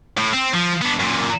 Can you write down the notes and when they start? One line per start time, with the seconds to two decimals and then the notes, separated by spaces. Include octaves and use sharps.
0.17 A2
0.33 C4
0.54 F3
0.82 B3 D4
1.00 F#2 A#2